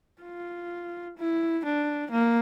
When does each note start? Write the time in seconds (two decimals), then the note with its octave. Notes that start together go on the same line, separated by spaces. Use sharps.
0.22 F4
1.17 E4
1.64 D4
2.11 A#3